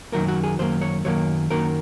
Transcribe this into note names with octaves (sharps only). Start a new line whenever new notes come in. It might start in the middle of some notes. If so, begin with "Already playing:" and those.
F#2 D#3 F#3 A#3 A#4
F#4
G#4
F#2 D#3 F#3 A#3 C5
C#5
F#2 D#3 F#3 A#3 C#5
F#2 D#3 F#3 A#3 A#4